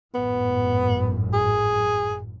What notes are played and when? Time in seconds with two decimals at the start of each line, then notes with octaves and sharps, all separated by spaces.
0.15 G#1 F#2 A2 B3
1.33 G#4